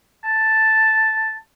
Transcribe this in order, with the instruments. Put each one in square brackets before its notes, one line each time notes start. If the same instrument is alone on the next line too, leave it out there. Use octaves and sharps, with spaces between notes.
[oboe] A5